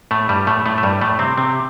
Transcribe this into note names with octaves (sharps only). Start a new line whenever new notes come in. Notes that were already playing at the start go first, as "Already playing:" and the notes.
A2 A3
G2 G3
A2 A3
A2 A3
A3
G2 G3
A2 A3
C3 C4
C3 C4